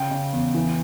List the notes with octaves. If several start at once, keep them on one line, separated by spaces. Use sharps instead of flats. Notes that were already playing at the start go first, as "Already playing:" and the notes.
Already playing: C#3 G5
C#3
E2
E3